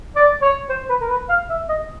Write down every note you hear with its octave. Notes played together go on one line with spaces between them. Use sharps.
D5
C#5
C5
B4
A#4
B4
F5
E5
D#5